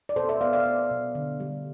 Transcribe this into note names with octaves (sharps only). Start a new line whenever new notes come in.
D5
B2 A4 C5
C5 E5
B3 D5 F5
D5 F5
B3
B2
D3
G3